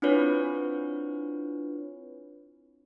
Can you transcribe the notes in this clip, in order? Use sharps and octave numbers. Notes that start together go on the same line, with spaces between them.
C4 D4 E4 F4 B4 C#5